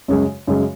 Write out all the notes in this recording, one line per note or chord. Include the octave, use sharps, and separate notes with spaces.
F#2 C#3 G#3
F#2 C#3 G#3